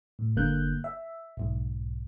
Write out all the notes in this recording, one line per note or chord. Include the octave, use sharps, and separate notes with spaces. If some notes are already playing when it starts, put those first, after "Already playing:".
A2
G1 D3 A#3 F#6 G6
E5
B1 G#2